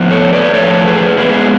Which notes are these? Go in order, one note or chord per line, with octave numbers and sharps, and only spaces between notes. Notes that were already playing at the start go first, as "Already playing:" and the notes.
Already playing: A2 F3 B3
A4 C#5
B4 D5
A2 F3 A3 A4 C#5
G#4 B4
G#2 G#3 B3 G#4 B4